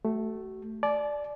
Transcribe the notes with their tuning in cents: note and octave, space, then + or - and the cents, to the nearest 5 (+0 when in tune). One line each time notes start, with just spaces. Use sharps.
A3 +0 F#4 +40
D5 +0 A5 -45